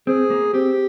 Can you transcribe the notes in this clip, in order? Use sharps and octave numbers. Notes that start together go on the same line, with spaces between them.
C4 G#4
A#3
C4 G4